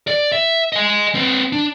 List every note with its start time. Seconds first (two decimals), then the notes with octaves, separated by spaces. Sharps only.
0.08 D5
0.32 E5
0.72 D#5 G#5
1.15 C4 B4
1.52 D4